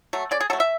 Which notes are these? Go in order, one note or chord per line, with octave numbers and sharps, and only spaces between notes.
F#3 A3
C#3 D5
G#4
F#3 A3 A4
E5